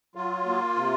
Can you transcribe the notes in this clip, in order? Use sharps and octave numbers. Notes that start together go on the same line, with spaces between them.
F#3 F4
A#3
C3